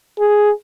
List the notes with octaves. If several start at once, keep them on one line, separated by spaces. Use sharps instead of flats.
G#4